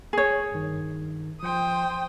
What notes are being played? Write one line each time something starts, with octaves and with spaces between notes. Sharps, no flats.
G#4 C#5 G#5
G2 D#3
F3 C5 G5 D#6